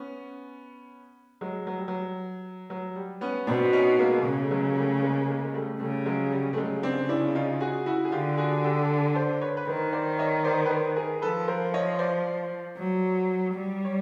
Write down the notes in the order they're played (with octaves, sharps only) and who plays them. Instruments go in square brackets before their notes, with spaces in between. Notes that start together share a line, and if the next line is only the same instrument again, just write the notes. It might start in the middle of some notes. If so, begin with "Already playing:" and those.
Already playing: [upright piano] B3 C#4
F#3 G#3
F#3
G3
F#3
F#3
G3
B3 C#4
[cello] B2 [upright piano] C4 D4
[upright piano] C#4 D#4
G#3 A#3
[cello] C#3
[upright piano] A3
F#3 G#3
A#3
G3 A3
G#3 A#3
G#3 A#3
G#3
G3 A3
[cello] C#3 [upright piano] G3 A3
[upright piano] F#3 G#3
G3
A3
[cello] C#3 [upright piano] F#3 G#3
[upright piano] C4 D4
D4 E4
D#4 F4
F#4 G#4
E4 F#4
G#4
[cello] D3 [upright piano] F4 G4
[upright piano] F#4 G#4
G#4
G4 A4
C5 D5
B4 C#5
B4
[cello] D#3 [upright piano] A#4 C5
[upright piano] C5 D5
C#5 D#5
C5 D5
B4
A#4 C5
G#4 A#4
[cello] F3 [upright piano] A4 B4
[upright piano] A#4 C5
C#5 D#5
C#5
C5 D5
[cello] F#3
G3
[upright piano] C#5